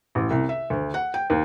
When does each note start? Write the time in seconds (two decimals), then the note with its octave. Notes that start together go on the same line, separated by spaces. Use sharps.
0.15 A1
0.30 C2
0.49 E5
0.70 D2
0.94 F#5
1.14 G5
1.30 D#2